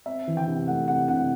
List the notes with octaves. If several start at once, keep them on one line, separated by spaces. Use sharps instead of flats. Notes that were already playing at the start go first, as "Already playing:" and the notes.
C4 E5
E3
G5
C3
A3 F#5
C3 F#5
C3 F#5